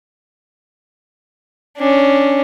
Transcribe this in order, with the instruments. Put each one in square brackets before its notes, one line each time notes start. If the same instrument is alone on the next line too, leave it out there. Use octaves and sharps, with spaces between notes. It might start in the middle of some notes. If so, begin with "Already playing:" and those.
[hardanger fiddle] C#4 D4